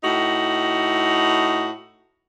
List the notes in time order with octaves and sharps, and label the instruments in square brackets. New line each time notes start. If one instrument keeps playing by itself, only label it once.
[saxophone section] A2 D#4 F#4